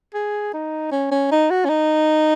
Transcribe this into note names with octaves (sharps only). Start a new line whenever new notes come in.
G#4
D#4
C#4
C#4
D#4
F#4
C#4
D#4